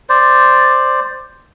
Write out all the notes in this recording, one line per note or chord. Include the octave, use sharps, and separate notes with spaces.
C5 D5